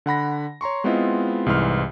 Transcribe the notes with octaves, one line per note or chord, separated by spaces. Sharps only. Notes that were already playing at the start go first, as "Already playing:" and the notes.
D3 F#5 B5 A#6
C#5 A#5 C6 C#6
G#3 B3 C4 E4 F4 D#5
C2 G#2 E3 C6 F6